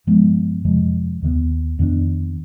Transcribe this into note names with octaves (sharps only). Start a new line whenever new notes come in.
G2 F3 G#3 B3
F2 C3 F3 G#3
D#2 D#3 G#3 B3
F2 D#3 B3 D4